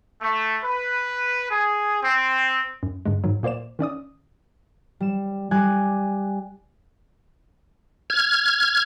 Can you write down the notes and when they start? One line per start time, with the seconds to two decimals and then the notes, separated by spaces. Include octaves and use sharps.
0.21 A3
0.64 B4
1.51 G#4
2.02 C4
2.83 F#2
3.06 G2 D3 G#3
3.24 G#2 D#3 F#3
3.43 A#2 A#3 C5 D5 E7
3.79 D#3 C#4 D5 D#6
5.00 G3 E7
5.51 G3 G#5 D6 F#6 G#6
8.10 F6 G#6